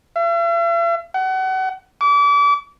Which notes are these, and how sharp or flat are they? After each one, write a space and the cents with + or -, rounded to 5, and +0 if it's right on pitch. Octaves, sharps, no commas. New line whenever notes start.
E5 +45
F#5 +30
D6 -35